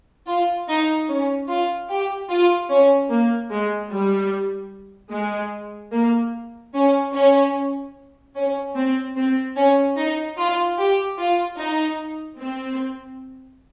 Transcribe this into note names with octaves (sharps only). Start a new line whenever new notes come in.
F4
D#4
C#4
F4
G4
F4
C#4
A#3
G#3
G3
G#3
A#3
C#4
C#4
C#4
C4
C4
C#4
D#4
F4
G4
F4
D#4
C4